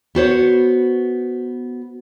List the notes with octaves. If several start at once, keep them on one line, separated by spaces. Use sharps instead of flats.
B3 F#4 C5 C#5